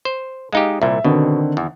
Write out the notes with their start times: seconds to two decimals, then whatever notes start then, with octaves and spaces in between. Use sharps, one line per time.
0.05 C5
0.53 G#3 D#4 G4 F5
0.82 C2 A#2 E5
1.05 B2 D3 D#3 C4
1.57 E2